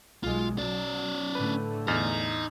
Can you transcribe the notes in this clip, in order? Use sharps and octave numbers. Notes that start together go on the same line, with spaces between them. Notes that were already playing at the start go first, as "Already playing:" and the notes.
B1 G#3 F4
F#3 C#4 D5
A2 D3 A3 B4
E2 D#4 D#5 F6 A6